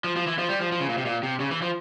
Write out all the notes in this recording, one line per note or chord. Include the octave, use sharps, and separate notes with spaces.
F3
F3
E3
F3
G3
F3
F3
C#3
A#2
C3
A#2
C3
C#3
E3
F3